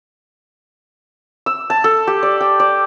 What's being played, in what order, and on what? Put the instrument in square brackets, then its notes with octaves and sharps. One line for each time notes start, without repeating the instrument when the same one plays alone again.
[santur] E6
A5
A4
G4
D5
G5
D5